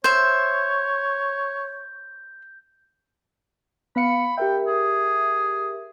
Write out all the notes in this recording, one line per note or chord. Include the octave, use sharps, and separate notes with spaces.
C5 C#5 E5 G6
B3 F5 B5 C#7
G4 A#4 E5 G5
G#4